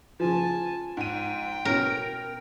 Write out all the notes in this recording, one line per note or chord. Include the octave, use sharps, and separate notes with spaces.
C#3 F3 G#5 A5
G#2 G5 D#7
B2 C#4 A#4 D7